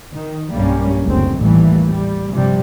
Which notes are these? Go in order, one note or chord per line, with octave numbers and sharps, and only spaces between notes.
D#3
B1 G2 G3 A#3 C#4
F#1 D2 C4
A1 D#2 A#2 E3 G3 A3
G3
G2 C3 F3 G3